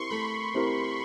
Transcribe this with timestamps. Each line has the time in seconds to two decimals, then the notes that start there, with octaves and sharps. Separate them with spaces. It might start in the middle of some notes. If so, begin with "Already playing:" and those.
Already playing: C4 E4 G4 A#4 C6 C#6
0.10 A3 B5
0.54 C4 E4 G4 A#4